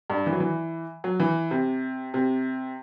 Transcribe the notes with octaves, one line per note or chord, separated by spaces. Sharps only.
G2
E3
F#3
E3
F#3
E3
C3
C3